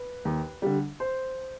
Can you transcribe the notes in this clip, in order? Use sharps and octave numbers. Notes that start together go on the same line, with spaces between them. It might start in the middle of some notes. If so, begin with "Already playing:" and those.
Already playing: B4
D#2
D3 G3
C5